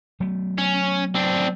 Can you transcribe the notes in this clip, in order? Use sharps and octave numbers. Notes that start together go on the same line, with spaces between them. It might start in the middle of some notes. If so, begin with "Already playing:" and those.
F#3 A3 B3
C#4
C4 D4